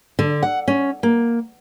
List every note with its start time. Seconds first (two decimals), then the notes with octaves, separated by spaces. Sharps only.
0.19 D3
0.43 F#5
0.68 C#4
1.03 A#3